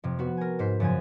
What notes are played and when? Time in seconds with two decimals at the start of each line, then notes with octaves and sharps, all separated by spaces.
0.04 F2 C3
0.19 B3 F#4 B4
0.37 A#4 G#5
0.59 G#2 C5 B6
0.80 F#2 C#3 F3 G#5